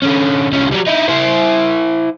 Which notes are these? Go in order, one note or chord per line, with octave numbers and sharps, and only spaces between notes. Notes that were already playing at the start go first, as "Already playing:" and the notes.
D3 C#4
C2 C#4
F#3 G3
D#4 E4
E4 C5